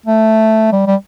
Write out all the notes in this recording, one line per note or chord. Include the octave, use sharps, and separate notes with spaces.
A3
G3
G3